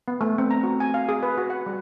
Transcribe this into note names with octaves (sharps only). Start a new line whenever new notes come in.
B3
A3
C4
A#5
F#4
G#5
F5
G#4
B4
F#4
F#5
G3